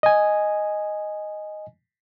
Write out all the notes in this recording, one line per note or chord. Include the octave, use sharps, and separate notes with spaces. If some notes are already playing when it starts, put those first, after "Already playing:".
D#5 G#5